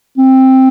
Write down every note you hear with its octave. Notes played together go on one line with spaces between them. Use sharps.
C4